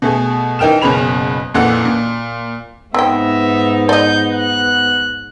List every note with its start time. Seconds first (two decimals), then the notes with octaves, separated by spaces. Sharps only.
0.02 B2 A3 G#4
0.59 E3 D#4 A#4 G5 F6 E7
0.82 F#1 B2 C#4 G#4 B5 F7
1.54 F2 A#2 E3 A4 F#5
1.85 A#2
2.94 G#2 B3 C4 D#4 E5 G5
3.89 B3 D5 D#5 G6
4.31 F#6